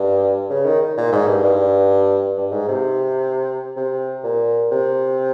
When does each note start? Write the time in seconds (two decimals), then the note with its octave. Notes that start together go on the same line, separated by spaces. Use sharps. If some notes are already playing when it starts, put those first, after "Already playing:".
Already playing: G2
0.50 C#3
0.66 D#3
0.97 A#2
1.12 G#2
1.28 G2
1.44 G2
2.37 G2
2.52 G#2
2.68 C3
3.76 C3
4.24 A#2
4.71 C3